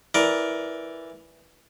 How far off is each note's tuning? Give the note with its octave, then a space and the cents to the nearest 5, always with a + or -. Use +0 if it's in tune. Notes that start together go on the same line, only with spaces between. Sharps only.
E3 +0 A#4 +10 D5 +0